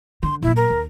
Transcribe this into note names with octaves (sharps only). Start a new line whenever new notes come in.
D3 C6
A#2 F#3 E4
A#4
D#2